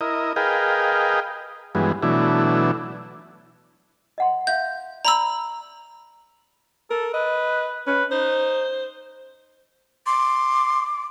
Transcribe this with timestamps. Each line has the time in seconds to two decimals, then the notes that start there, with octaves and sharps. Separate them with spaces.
0.01 E4 A#4 D#5
0.36 G#4 A#4 B4 D#5 F5 G5
1.75 G2 E3 F#3 G#3 B3
2.02 B2 E3 F#3 A3 D4 E4
4.18 D#5 F#5 C6
4.47 E5 F5 G6
5.05 D5 A#5 B5 E6
6.90 A4 A#4
7.14 B4 D#5
7.87 C#4 B4
8.11 D#4 C5
10.06 C6 D6